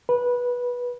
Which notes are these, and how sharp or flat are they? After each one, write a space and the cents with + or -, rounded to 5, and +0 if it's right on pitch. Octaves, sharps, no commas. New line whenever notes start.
B4 -15